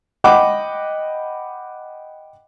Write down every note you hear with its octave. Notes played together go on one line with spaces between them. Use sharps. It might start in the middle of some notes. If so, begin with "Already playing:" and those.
D#5 F#5 G5 B5 D6